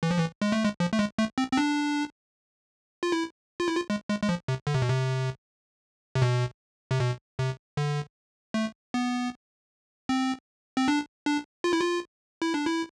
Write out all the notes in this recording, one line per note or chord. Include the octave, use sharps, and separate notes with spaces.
E3
F3
E3
G#3
A3
G#3
F3
A3
G#3
A3
C4
C4
D4
F4
E4
F4
E4
F4
G#3
G#3
G#3
F3
C3
D3
C3
B2
C3
C3
B2
C3
B2
C3
D3
A3
B3
C4
C4
D4
D4
F4
E4
F4
E4
D4
E4